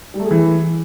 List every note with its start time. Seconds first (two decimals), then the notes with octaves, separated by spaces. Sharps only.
0.14 G3
0.20 A3
0.25 G#4
0.31 E3